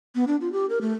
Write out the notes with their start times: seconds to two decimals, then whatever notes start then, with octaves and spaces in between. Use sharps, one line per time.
0.15 B3
0.27 D4
0.41 F4
0.52 G4
0.70 A#4
0.81 A3